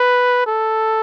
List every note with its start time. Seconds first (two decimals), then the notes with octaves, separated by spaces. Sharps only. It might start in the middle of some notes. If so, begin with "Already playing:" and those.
Already playing: B4
0.46 A4